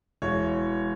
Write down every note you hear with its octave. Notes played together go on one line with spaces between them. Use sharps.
E1 C#5